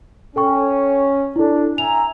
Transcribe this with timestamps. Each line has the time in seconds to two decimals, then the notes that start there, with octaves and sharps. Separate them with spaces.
0.36 C#4 A4 G5 C#6
1.36 D4 E4 A4
1.78 E5 G#5 A#5 F7